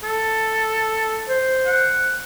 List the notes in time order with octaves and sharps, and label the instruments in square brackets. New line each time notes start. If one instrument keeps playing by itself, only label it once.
[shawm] A4
[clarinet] C5
[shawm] F#5